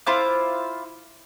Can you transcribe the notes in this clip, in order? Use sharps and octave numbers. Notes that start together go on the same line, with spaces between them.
E4 F4 C5 D6